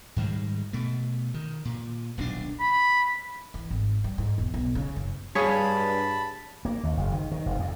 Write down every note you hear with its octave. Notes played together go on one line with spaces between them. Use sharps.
G#2 D#3 G3 G#3
B2 A3
D#3
A#2
D#1 B1 C4 D4
B5
E3
G#1
G3
G#2
E1
B1
C#3
F#1
G2 G#4 C#5 F5 G#5 A5 B5 B6
A#3
D#2
F#1
D#3
D#3
F1
F2